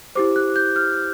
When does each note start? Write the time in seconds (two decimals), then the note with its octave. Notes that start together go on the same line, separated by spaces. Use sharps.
0.15 E4 G4 C5 D6
0.36 F#6
0.56 G6
0.76 F6